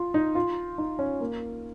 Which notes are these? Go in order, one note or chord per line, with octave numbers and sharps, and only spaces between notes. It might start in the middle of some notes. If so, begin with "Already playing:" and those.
Already playing: F4
D#4
F4
D#4
C#4
A#3